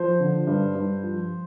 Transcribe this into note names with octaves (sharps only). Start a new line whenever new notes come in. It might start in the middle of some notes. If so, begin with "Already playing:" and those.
Already playing: F3 C5
D3
G2
G2
F3